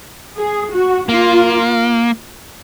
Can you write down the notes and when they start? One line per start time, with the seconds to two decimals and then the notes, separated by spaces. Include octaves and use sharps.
0.37 G#4
0.73 F#4
1.09 A#3 F4